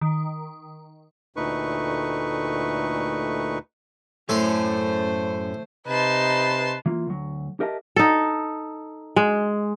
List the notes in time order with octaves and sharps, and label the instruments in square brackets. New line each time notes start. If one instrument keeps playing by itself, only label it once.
[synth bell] D#3
[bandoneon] D2 A#2 A3 D#4 B4 C#6
[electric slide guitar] F#2 C#5 G#5 [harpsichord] A2 A4 C6 [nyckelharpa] A3 C5
[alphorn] C3 [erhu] D#4 [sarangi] B4 [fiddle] A5 C6
[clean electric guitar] E3 A#3 F4
D2 F#3
G4 A#4 D#5 E5 F#5 A5
[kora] D#4 A4
G#3